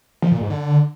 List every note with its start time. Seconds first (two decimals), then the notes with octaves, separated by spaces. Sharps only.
0.22 F3
0.32 A#2
0.41 G#2
0.50 D3